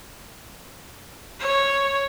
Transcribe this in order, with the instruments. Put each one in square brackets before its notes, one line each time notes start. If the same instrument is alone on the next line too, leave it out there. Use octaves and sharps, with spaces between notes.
[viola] C#5